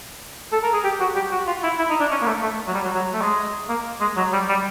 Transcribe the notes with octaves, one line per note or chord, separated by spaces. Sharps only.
A4
A#4
G#4
G4
F#4
G4
F#4
F4
E4
E4
D#4
D4
C#4
A#3
A3
A3
F#3
G3
F#3
F#3
A3
G#3
A#3
G#3
F#3
G3
G3